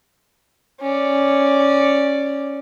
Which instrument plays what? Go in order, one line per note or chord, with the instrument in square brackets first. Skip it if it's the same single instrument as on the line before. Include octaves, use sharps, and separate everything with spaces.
[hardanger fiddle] C#4 D5